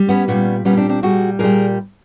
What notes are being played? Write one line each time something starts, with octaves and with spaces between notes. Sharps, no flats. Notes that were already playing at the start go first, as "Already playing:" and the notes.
Already playing: G3
B3 C#4
A#2 G3 B3 C#4
A#2 G3 B3 C#4
C4 D4
C4 D4
A#2 G3 F#4 G#4
A#2 G3 G#4 A#4